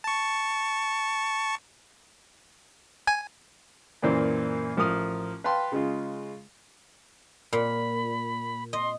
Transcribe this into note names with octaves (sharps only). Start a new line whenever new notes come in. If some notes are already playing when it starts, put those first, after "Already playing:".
A5 C#6
G#5
F#2 A#2 E3 A#3 C5 D5
A1 F3 A#4 D#6 F6
B4 F5 G5 A5 C6
C#3 G#3 F4
A#2 B5
D#5 C6